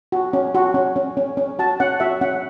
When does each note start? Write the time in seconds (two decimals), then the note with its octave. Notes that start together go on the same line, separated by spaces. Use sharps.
0.12 F#4
0.33 C#4
0.55 F#4
0.74 C#4
0.96 C#4
1.17 C#4
1.37 C#4
1.59 F#4 A5
1.80 C#4 F#5
2.00 F#4 E5
2.21 C#4 F#5